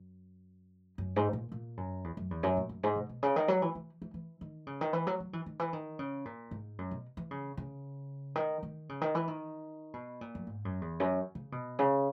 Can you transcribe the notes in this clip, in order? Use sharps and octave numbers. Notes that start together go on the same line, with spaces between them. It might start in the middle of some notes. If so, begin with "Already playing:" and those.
Already playing: F#2
F#2
G#2
A#2
A#2
F#2
E2
F#2
E2
F#2
A#2
F#2
G#2
B2
B2
C#3
D#3
F#3
E3
E3
E3
E3
D#3
C#3
D#3
E3
F#3
F#3
E3
D#3
E3
D#3
C#3
A#2
G#2
F#2
B2
E3
C#3
C#3
D#3
D#3
C#3
D#3
E3
D#3
B2
A#2
F#2
G#2
F#2
E2
F#2
C#3
B2
C#3